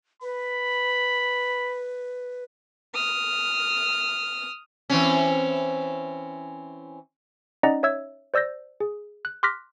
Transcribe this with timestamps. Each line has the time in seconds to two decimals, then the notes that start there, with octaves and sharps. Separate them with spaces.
0.22 B4 B5
2.94 D#6 F6
4.90 E3 C4 C#4
7.63 C#4 D#4 D5 D#5 F#5 A#5
7.83 C#5 E5 E6 G#6
8.34 C5 D5 E6 G6 A#6
8.80 G#4
9.25 F#6
9.43 C6 D6 F6 F#6 A#6 B6